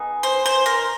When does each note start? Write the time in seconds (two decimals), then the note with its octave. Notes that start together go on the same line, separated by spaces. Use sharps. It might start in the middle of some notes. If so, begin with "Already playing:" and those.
Already playing: B3 D#4 G#4
0.23 C5
0.46 C5
0.66 A#4